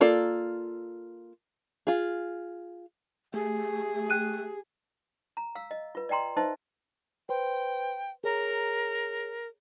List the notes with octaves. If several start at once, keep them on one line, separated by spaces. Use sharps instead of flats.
A#3 F4 A4 D5
F4 G#4
A3 G4 G#4
G5 F#6 D#7
A#5
F5 E6
D#5
F4 B4
D5 D#5 G5 A#5 C6
D#4 B4 C5 D#5 E5 A5
B4 C5 G5 C6
G#4 A#4 C#5 A#5